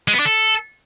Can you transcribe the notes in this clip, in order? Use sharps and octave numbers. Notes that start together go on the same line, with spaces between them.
G#3
B3
D4
A4